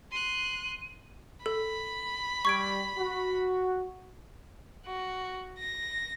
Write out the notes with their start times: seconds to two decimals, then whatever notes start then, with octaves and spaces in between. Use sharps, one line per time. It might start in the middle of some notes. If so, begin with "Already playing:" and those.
0.11 C6 F#6 D#7
1.46 A4 B5
2.45 G3 C#6 G#6 D7
2.96 F#4
4.86 F#4
5.59 A#6